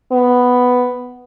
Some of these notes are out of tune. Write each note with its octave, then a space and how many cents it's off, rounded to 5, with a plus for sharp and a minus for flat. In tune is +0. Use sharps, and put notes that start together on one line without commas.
B3 +5